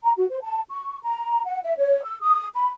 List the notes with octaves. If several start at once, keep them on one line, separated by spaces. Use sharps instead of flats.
A#5
F#4
C5
A5
C#6
A#5
F#5
E5
C#5
E6
D#6
B5